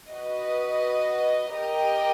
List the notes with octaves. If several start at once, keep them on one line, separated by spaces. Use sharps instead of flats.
F#4 B4 D#5
G4 A#4 D#5 G5